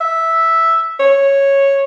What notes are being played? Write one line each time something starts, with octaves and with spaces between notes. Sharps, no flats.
E5
C#5